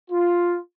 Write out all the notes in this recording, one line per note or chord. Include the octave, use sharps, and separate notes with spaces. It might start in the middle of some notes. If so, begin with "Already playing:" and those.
F4